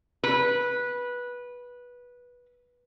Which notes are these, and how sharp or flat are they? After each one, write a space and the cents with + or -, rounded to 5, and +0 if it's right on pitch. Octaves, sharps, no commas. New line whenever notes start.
B4 -15